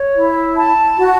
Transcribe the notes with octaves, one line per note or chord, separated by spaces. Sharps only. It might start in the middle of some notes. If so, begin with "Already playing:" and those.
Already playing: C#5
E4
A5
F#4